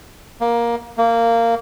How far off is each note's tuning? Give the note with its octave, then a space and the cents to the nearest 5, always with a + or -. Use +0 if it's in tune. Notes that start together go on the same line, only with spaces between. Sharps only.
A#3 +15
A#3 -15